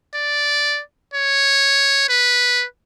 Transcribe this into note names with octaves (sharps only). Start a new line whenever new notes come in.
D5
C#5
B4